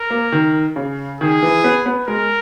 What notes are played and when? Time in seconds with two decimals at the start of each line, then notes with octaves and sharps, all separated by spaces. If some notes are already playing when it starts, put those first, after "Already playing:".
Already playing: A#4
0.10 A#3
0.32 D#3
0.76 C#3
1.20 D#3 G#4
1.42 E3
1.64 B3
1.86 B3
2.08 G#3 A#4